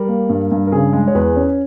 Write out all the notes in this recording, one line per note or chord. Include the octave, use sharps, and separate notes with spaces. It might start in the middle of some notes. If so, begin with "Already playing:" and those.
Already playing: G3 A#4
A#3
G2
G2
A#4
C#3 G#4
G#3
C#5
E2 G#4 B4
C#4